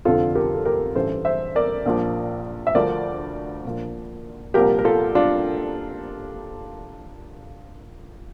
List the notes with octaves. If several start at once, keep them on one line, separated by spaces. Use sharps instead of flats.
F1 F2 D3 F3 F4 A4
G4 A#4
A4
G4 A#4
A1 G2 E3 A4 C5
C5 E5
A#4 D5
A#1 A#2 F3
E5
D2 D3 F3 A#4 D5
A#1 A#2 F3
C2 A#2 F3 G4 A#4
A#4
F4 A4
D4 F4